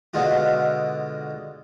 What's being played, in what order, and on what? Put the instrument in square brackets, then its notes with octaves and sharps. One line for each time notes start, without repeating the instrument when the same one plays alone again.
[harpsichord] B2 D3 G#3 F4 F#4